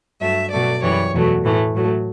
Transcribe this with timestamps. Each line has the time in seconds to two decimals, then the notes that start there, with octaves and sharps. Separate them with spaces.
0.20 G2 F#3 A3 E5
0.51 B2 F#3 A3 D5
0.82 F#2 E3 G3 C#5
1.13 E2 B2 F#3 A3
1.44 A2 E3 A3
1.75 A2 F#3 A3